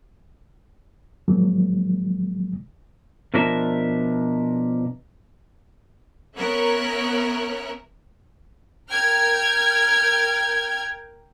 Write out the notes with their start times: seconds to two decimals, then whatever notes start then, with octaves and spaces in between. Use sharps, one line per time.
1.28 A2 D#3 F3 F#3 G#3 A#3
3.34 B2 F3 D4 A#4 E5 A5
6.36 B3 C#4 A#4 E5 A#5 F#6
8.89 A#4 G5 F6 G#6